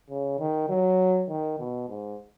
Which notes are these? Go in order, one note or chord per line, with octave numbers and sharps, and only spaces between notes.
C#3
D#3
F#3
D#3
B2
G#2